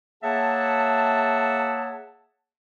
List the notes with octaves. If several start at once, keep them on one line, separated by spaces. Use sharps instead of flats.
A#3 G#4 C#5 E5 F#5 A5